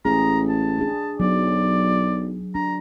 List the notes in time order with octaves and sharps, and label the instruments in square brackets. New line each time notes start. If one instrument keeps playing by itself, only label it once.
[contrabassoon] A1 [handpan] G#4 [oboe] A#5
[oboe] A5
[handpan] D4 G#4
[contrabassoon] B1 [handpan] F#3 [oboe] D5
[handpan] D4 [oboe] A#5